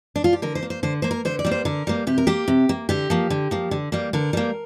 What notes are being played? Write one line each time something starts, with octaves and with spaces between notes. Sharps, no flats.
D4
F4
G4
D3 A#4
C5
A#3
C5
D3 C5
A#3 C5
A#4
D3 C5
D5
G3 A#3
C5
D3 A#4
G3 A#3
C3 G4
A#4
A#3 G4
C3
A#3
D3 G4
F3 A#3
D3
F3 A#3
D3
G3 A#3
D3 A#4
G3 A#3